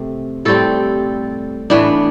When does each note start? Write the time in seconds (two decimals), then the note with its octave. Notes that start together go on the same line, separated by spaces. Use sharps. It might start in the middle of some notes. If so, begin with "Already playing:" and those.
Already playing: C3 A3 C4
0.45 A2 G3 C4 A4
1.70 A2 E3 B3 D4